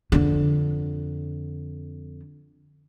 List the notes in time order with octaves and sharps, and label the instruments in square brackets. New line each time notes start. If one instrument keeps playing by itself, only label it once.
[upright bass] F2 D3